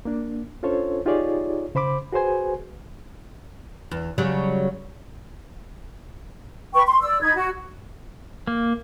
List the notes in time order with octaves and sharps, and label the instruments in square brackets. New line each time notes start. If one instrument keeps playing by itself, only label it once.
[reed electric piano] A#3 D4
C#4 D4 F4 A4 C5 C#5
D#4 F4 G4 G#4 C#5 D5
C#3 C5 B5 D6
F#4 G#4 B4 C5 G#5
[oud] E2
C#3 F#3 G3
[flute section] B4 G5 C#6
C6
D5 E6
D#4 B5 G#6
F#4
[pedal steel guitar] A#3